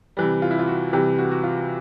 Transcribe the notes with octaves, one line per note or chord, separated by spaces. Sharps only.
C3 E3 G3
F4
E4
F4
F#4
C3 E3 G3 G4
F#4
F#4
F4